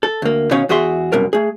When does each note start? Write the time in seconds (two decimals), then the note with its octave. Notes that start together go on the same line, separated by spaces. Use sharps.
0.03 A4
0.22 D2 A#3
0.51 B2 D#3 C#4 C#5 F5
0.69 E2 F#4 G#4 E5 C6
1.12 C2 F#2 B2 A#4
1.33 A3 G#4